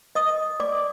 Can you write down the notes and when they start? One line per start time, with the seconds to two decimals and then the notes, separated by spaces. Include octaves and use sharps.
0.15 D#5 D#6
0.60 D5 D6